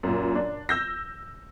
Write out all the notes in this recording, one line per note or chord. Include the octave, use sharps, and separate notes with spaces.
F#2 A#2
D4
E6 G6 A#6